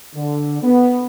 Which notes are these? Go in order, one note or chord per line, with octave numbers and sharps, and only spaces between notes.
D3
B3